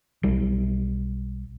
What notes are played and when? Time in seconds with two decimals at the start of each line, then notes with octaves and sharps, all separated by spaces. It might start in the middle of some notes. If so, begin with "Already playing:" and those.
0.23 B1 G3